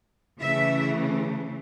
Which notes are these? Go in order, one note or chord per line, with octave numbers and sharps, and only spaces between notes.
C#3 E3 A3 E5